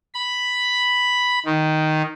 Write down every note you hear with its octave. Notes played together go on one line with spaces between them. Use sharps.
B5
D#3